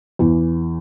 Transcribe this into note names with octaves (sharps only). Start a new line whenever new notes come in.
E2 E3